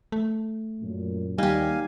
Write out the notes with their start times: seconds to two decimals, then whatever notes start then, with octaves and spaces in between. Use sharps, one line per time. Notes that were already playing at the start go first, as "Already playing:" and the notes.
0.12 A3
0.81 F#2 A#2
1.38 D#2 G3 D#4 G4 F5 G#5